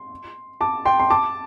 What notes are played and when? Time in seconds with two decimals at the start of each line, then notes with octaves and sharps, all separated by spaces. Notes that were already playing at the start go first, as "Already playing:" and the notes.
Already playing: C6
0.61 A5 D6
0.85 G5 C6
1.00 C6
1.10 A5 D6